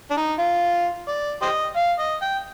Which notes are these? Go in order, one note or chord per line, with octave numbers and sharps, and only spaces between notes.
D4
D#4
F4
D5
G4 C5 D#5
F5
D#5
G5